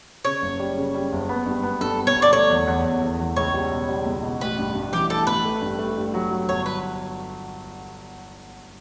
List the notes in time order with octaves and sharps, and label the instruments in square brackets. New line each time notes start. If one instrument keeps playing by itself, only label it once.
[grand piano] C#3 [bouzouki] C#5
[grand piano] F#1
G3
C#3
G3
F#1
B3
G2
B3
[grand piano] G2 [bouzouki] A4
[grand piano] B3
[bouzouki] C#5
[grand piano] G1
[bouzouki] D5
[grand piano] A3 [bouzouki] C#5
[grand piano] E2
E2
E2
E2
E2
[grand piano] C#2 [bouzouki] C#5
[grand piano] G3
B2
G3
C#2
B2
[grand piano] A1 [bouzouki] B4
[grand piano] G2
G2
[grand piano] E3 [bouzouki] G4
[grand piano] E3 [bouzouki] A4
[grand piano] A1 [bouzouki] B4
[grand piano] A3
G2
A3
G2
F#3
F#3
[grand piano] G1 [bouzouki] C#5
[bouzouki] B4